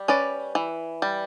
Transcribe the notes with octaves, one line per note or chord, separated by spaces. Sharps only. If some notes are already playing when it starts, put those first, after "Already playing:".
Already playing: G3
C#4 B4 D5
E3
G3